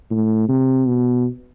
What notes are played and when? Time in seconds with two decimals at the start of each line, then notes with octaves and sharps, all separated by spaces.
0.11 A2
0.49 C3
0.86 B2